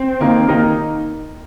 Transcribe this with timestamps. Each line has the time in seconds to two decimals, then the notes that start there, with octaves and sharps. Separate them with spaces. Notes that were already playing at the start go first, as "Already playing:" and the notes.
Already playing: C4
0.21 D#3 A#3 D#4 A#4
0.48 D#3 A#3 D#4 A#4